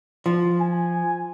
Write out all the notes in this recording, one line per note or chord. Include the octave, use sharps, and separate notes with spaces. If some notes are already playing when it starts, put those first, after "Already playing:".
F3
G#5